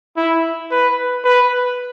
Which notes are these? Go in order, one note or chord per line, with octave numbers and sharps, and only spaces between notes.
E4
B4
B4